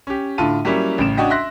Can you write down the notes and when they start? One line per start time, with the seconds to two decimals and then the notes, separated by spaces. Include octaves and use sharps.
0.07 C#4 G4
0.38 A2 D3 F4 A5 D#7
0.65 F#3 G3 A#3 C#4 E4
0.98 A1 C#3 D7 E7
1.17 C#4 D4 F#4 D#5 G5
1.30 E5 C6 F#6 A#6